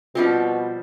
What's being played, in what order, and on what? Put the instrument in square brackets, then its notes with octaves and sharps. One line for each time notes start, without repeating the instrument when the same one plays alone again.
[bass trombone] B2 [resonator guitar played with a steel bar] F3 G3 C4 [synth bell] F4